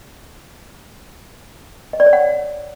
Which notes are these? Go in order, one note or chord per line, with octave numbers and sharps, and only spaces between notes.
D#5
D5
C#5
F#5